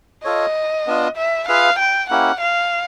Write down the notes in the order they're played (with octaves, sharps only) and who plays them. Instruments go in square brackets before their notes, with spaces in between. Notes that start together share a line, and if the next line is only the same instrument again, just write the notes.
[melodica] F4 A4 C#5 [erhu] D#5
[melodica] B3 D4 F4
[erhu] E5
[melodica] F4 G#4 B4 E5 [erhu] F5
[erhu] G5
[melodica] A#3 C#4 E4 G4 [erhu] F#5
[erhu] F5